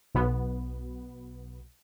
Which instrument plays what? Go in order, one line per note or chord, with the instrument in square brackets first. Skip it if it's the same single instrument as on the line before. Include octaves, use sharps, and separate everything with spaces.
[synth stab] B1 B2 B3